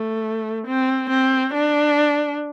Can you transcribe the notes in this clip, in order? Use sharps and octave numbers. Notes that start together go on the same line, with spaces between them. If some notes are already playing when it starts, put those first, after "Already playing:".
Already playing: A3
C4
C4
D4